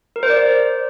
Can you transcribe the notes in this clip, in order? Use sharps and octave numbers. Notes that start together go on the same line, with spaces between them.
A#4
C5
D5